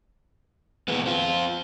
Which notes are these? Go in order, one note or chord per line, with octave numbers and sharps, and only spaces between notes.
A#2 D#3 E3 G#3 A#3 B3
C4 F4